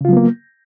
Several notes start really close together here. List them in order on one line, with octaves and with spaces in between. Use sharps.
C#3 F4 F#3 B3 A#3